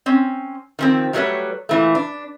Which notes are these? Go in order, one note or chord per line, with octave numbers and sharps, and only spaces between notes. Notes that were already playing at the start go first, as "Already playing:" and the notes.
C4 C#4
D#3 F3 C4
F#3 G3 A3 F4 B4 C#5
A#2 E3 A3
D4